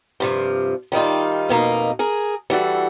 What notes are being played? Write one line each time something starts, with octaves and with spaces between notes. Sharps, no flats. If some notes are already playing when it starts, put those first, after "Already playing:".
G2 C3 F3
D#3 G3 D#4 F4
F2 B2 A#3 D#4
G#4 A#4
E3 G3 F#4 A4